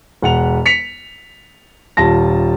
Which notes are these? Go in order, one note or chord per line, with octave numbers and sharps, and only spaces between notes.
E1 F#5 F7
B6 C#7 F7
D#1 F4 A5 A#6